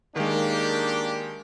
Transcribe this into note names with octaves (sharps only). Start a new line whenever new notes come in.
D#3 G#3 A#3 D4 G4